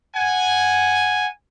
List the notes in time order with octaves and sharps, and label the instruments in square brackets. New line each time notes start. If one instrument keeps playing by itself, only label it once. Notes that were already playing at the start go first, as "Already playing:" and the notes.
[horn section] F#5 G#5